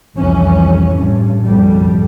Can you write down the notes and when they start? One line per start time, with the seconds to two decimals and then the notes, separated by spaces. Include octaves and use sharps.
0.17 C2 F2 E3 C#4
0.95 A1 G2
1.45 F#1 B1 F2 A2 G3